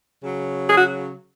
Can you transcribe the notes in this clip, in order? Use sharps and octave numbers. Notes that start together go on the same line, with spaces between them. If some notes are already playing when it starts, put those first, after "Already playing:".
C#3 F#3
G#4
F#4